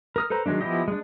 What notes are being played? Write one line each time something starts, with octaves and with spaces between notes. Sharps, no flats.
A#4 D#6 F6
A4 B4 C5 A#5
D#3 F#3 G#3 A3 D4
F3 B3 E4 G4 D#5
G#3 D4